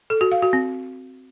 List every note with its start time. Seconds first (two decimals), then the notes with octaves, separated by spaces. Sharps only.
0.10 A4
0.21 F#4
0.32 F5
0.42 F#4
0.53 C4